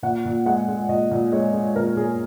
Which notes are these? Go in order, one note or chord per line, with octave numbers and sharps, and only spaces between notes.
A#2 F#5
A#2
G#3 F#5
G#3
A#2 D#5
A#2
G#3 C#5
G#3
A#2 A#4
A#2 G#4